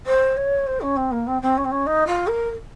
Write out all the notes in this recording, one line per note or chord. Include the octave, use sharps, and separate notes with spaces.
C5
C#5
C5
C#4
C4
A#3
C4
C4
C#4
C4
C#4
D#4
F4
A#4